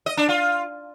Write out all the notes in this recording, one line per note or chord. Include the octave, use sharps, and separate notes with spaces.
D#5
D4
F4